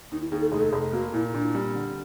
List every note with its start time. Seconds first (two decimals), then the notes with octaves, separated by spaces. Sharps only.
0.11 D#2 D#4
0.22 E4
0.31 D#2 G#4
0.41 A4
0.51 F1 G#4
0.61 A4
0.70 G#4
0.73 F1
0.92 A#3 F#4
1.14 A#2 E4
1.34 A#2 D4
1.55 G3
1.75 D3